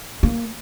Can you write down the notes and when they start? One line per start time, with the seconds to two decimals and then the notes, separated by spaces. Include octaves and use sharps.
0.23 A#3